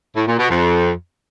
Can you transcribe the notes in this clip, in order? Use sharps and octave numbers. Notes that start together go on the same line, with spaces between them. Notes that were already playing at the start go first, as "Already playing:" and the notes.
A2
A#2
B2
F2